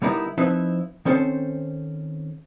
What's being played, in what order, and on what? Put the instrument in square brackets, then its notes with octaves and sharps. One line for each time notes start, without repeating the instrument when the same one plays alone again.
[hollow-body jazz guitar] D3 G3 B3 D#4 E4 A#4
F3 C4 D#4 E4 B4 E5
D#3 C4 C#4 A4 C5